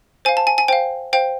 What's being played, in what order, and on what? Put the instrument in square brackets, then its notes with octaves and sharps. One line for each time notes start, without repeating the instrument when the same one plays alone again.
[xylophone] C5 F5 G#5
A5
G#5
G#5
C5 F5 G5
C5 F5 G5